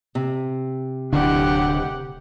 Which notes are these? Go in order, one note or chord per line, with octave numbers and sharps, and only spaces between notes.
C3
D1 D3 D4 G4 F#5